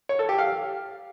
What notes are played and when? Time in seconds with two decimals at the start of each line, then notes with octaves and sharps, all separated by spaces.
0.09 C#5
0.19 A4
0.29 G4
0.39 F5